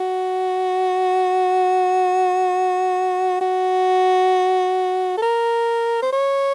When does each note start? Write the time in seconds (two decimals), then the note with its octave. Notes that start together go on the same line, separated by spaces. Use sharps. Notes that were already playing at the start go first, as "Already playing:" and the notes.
Already playing: F#4
3.41 F#4
5.17 A4
5.22 A#4
6.02 C5
6.13 C#5